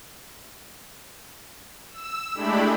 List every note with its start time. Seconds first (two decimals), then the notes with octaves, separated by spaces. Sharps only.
1.91 E6
2.35 G#3 A3 D4 E4 G4 B5